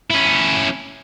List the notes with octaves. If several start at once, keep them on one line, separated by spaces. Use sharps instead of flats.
C#4 E4